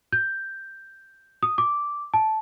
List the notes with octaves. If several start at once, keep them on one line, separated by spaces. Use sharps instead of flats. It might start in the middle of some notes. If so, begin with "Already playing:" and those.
G6
D#6
D6
A5